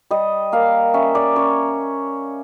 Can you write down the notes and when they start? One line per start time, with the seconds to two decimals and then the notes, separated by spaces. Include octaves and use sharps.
0.11 G3 D#5
0.52 A#3 F5
0.94 C#4 E5
1.15 D5
1.36 C#4 C#5